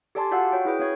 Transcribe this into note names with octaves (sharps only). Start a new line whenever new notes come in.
G4 A4 D5 G#5 A5 C6
F4 F#4 D5 F5 F#5 E6
F#4 C#5 G5
E4 G#4 B4 G5
C#4 C#5 F5 G#6